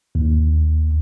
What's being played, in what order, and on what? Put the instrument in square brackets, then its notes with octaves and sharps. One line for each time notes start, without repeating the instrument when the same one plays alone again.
[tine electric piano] D#2